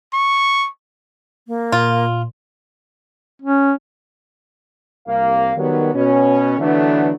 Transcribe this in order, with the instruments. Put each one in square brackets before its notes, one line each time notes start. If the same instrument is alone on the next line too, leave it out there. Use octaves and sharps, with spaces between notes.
[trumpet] C#6
[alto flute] A#3
[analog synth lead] A#2 [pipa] F4
[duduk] C#4
[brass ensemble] C2 A#3 F5
D#3 F#3 G3 B3
B2 C#4
D3 E3 F#3 A3 B3 D4